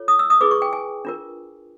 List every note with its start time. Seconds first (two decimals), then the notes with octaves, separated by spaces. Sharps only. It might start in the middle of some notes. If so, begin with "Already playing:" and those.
Already playing: F4 A4 C#5
0.08 D#6
0.19 E6
0.30 D#6
0.41 E4 G#4 B4 D6
0.51 C#6
0.62 G5
0.73 G#5
1.05 D4 F4 A#4